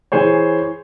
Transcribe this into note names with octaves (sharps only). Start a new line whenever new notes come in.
E3 G#4 C5 C#5